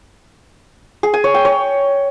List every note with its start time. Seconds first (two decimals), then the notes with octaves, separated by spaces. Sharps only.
1.03 G#4
1.14 G#5
1.24 C#5
1.34 G5
1.45 C#5